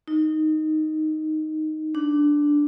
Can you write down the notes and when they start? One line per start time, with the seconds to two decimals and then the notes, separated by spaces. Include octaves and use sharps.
0.08 D#4
1.95 D4